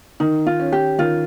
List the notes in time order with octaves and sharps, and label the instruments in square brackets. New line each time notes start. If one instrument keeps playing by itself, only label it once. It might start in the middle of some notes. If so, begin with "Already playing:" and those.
[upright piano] D#3 [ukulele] D#4
[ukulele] F4
[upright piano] C#4
[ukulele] G4
[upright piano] D#3 [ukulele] F4